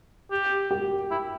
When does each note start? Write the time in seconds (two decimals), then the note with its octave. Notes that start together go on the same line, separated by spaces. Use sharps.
0.31 G4
0.71 G4
1.10 E4